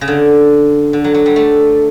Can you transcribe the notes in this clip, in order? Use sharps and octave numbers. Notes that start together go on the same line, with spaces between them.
C#3
D3
D3
F#3
F#3
G3
A3